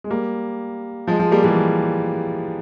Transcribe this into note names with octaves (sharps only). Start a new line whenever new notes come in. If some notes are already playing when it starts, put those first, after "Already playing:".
G#3
G3 A#3
F3 G#3
F3 G#3
G3 A#3
E3 G3